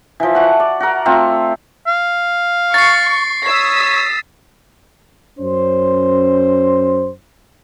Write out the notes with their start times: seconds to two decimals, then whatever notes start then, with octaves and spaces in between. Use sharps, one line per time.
0.20 E3 F3
0.35 F#4 F#5
0.60 D5
0.80 F#4 A#4
1.06 A3 C4 F4
1.87 F5
2.74 C#6 A6 C7
3.45 C#5 D#6 E6 B6
5.39 F#2 C#4 C5